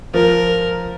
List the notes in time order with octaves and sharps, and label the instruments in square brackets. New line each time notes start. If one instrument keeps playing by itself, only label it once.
[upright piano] F3 [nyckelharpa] A#4